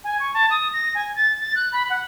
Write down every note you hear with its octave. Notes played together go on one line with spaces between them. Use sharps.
G#5
C#6
A5
D#6
A#6
G#5
A6
A6
F#6
B5
F#5